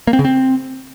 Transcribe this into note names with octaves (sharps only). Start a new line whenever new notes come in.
A#3
C4
C#3
C4